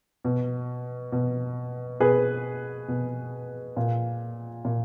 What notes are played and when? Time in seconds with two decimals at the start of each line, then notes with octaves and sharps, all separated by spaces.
0.25 B2
1.12 B2
2.00 B2 G#4 B4
2.88 B2
3.77 A#2
4.65 A#2